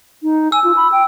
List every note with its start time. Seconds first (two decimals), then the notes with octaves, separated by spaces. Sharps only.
0.23 D#4
0.52 G#5 E6
0.64 F4
0.77 B5
0.92 G5